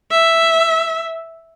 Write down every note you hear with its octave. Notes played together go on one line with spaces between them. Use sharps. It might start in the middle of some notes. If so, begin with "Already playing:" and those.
E5